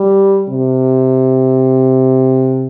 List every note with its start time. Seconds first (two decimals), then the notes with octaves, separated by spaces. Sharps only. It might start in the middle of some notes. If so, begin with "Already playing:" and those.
Already playing: G3
0.49 C3